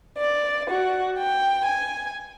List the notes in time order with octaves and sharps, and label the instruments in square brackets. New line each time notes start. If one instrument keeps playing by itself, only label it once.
[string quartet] D5
F#4
G5
G#5